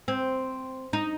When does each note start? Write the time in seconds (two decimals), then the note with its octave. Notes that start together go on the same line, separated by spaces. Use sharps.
0.08 C4
0.93 D#4